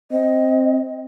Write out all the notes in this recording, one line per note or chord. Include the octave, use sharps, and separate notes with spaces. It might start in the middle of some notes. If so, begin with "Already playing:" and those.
C4 D#5